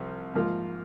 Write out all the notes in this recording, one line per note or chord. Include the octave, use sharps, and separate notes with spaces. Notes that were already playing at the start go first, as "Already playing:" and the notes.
Already playing: C2 C3 F3
G#2 F3 A#3 F4